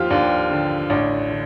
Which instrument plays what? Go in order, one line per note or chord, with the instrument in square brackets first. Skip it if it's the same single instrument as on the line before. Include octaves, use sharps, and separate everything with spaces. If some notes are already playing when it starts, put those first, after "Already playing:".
Already playing: [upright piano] D#2 F3 F4 G4
D#2 D4
D3
A1 D4
D3